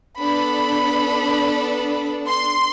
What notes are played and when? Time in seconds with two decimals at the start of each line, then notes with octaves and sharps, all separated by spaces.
0.20 B3 D4 A4 B5
2.28 C6